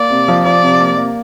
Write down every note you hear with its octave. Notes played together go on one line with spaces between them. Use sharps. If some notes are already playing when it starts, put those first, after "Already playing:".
Already playing: A#3 D5
C3
F3
F3 D5
C3
A#3
A#3